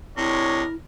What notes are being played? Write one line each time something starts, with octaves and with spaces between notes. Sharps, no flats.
C3 G#3 D4 E4 A#4 C#5